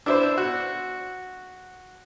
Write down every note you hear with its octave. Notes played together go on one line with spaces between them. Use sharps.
D4 E4 C5
F#4